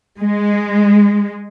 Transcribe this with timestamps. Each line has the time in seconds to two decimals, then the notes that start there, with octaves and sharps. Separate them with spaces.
0.19 G#3